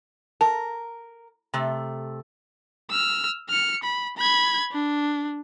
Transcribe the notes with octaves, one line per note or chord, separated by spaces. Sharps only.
A#4 A5
C3 A3
E6 F6
F6 C#7
B5
B5 G#6
D4